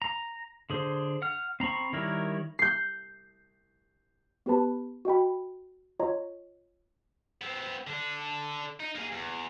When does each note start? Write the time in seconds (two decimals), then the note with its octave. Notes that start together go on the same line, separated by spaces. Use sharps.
0.02 A#5
0.70 D3 G#4 C5
1.22 F#5 F6
1.60 C4 A#5 B5 C#6
1.93 D#3 G3 E4 A#4 C#5
2.59 G6 C7
4.46 B3 G4 B4 A5 B5
5.05 F#4 D#5 G5 B5
6.00 F4 C#5 D#5 A#5
7.42 B3 C4
7.87 D3 D4
8.80 D#4
8.95 A#3 G#4
9.12 E2